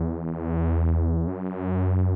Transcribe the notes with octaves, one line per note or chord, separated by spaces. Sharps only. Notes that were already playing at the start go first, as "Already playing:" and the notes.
Already playing: E2
F#2